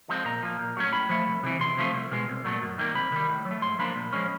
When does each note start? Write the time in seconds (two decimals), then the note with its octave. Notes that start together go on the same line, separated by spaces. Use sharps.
0.09 F3 G#3 C4
0.25 A#2 A#5
0.43 F3 A#3
0.59 A#2
0.77 F#3 A3 C#4
0.93 A2 B5
1.09 F3 A3
1.27 C2
1.43 C3 E3
1.60 E2 C6
1.77 C3 F3 A3
1.94 C2
2.11 B2 G#3
2.28 C2
2.44 A#2 F#3 A3
2.62 F#2
2.78 D#3 G3 A#3
2.95 C3 B5
3.12 D#3 G3
3.29 A2
3.45 F#3
3.51 A3
3.62 G#2 C6
3.79 F3 A#3 D4 B5
3.96 A#2
4.13 F3 G#3 C#4